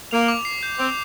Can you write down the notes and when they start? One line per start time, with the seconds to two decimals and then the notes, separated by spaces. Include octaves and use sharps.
0.11 A#3 F7
0.28 D6
0.45 C7
0.63 G6
0.78 C4 F7